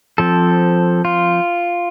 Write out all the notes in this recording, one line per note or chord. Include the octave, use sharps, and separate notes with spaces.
F3 C4 A4
F4